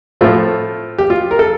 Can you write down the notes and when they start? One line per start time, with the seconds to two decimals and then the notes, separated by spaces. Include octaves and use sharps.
0.21 A2 F3 A3 C4 F4
0.98 G4
1.10 F4
1.31 A#4
1.39 A4